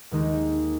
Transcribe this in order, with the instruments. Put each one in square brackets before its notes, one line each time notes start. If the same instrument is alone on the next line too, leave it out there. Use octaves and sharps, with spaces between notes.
[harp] D#2 D#3 G#3 D#4